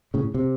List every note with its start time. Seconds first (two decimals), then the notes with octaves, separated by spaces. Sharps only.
0.14 A2 C#3
0.34 C3